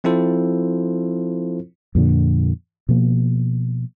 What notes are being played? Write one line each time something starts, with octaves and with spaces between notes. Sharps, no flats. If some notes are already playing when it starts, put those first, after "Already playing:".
F3 C4 E4 F4 A4 C5
F2 A#2 D3
B2 F3 A#3